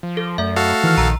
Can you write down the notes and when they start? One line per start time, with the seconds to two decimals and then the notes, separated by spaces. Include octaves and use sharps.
0.03 F3
0.17 A4
0.38 F#2 A3 E5
0.56 F#4 A4 F5
0.84 D#3 E3 F6
0.98 A#1 A#5 E6